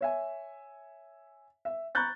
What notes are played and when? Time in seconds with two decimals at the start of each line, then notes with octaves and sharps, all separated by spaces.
0.01 C#5 E5 G#5
1.65 E5
1.95 A#5 B5 C#6 F#6 G6 A6